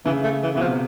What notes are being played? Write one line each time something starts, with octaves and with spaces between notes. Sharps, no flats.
C#3 E3
A3
E3
B2 E3
C3 F3